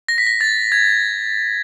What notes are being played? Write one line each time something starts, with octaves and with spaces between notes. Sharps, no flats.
A#6
B6
A#6
A6
G#6